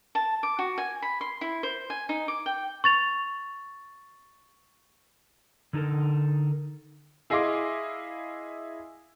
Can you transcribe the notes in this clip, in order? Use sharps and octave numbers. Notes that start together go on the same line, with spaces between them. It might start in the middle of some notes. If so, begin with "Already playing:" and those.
A5
D6
F#4
G#5
B5
C6
E4
C5
G#5
D#4
D6
G5
C#6 A6 F7
D3 D#4 F4 A4 A#4
E4 G#4 D#5 F5 C6 D6